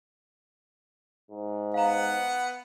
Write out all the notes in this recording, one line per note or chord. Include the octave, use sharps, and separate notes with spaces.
G#2
B3 F5 F#5 A#5